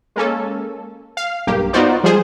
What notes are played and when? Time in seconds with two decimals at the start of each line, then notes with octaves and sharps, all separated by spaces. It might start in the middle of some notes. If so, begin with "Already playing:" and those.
0.16 G#3 A#3 C#4 A4
1.17 F5
1.47 B1 G2 A#3 G4
1.73 B3 D#4 F4 F#4 C5 D5
2.04 F3 G3 G#3 G#4 C5